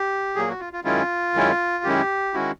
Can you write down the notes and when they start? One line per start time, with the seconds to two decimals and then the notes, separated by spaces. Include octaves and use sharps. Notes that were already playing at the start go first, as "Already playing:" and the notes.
Already playing: G4
0.35 A#2 F#3 A#3 G#4
0.48 F#4
0.60 F4
0.73 F4
0.84 F#2 D#3 G#3 C#4 E4 F4
1.34 F#2 D#3 G#3 C#4 E4
1.84 F#2 D#3 G#3 C#4 E4 G4
2.34 D#3 G#3 C#4 E4 F#4